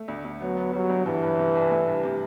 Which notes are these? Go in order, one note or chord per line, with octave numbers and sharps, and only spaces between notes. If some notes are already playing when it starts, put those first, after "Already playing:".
Already playing: A3
D2
D2
F#3 B3
B3
F#3 G3
D2
G2 E3
G2
C3
C2
A3
G2
C3